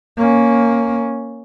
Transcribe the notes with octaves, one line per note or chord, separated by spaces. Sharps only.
A#3 C#4